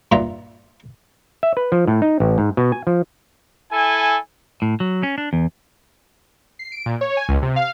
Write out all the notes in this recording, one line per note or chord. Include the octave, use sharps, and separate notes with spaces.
G2 A#2 D#3 F4 E5 A#5
E5
B4
F3
A2
D#4
A1
G#2
B2
G#5
F3
E4 A4 G#5
A2
F#3
C#4
D4
E2
C7
D7
A#2
C#5
G#5
C#2
C3
F5